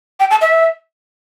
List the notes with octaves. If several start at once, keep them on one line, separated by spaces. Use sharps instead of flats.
G5
A5
E5